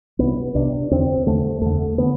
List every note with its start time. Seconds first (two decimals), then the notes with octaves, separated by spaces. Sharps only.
0.19 C2 C3 B3
0.55 C2 C3 D4
0.91 E2 D3 C4
1.26 E2 D3 A3
1.61 E2 D3 A3
1.98 D3 B3